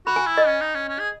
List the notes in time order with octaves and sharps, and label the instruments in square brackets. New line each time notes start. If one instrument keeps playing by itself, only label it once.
[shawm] F#4 [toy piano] B5
[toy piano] G#5
[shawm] E4
[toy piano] D#5
[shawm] C#4
D#4
C#4
C#4
G#4